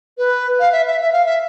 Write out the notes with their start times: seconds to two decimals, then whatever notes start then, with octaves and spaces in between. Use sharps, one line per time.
0.18 B4
0.60 F5
0.72 E5
0.87 E5
1.01 E5
1.13 F5
1.26 E5